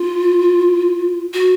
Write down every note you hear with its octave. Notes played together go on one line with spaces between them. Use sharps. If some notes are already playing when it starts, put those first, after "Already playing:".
Already playing: F4
F#4